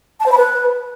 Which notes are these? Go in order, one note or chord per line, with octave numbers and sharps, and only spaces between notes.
A5
C5
B5
B4